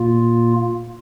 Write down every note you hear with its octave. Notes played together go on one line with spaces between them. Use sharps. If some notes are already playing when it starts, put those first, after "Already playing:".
Already playing: A#2 A#3 F4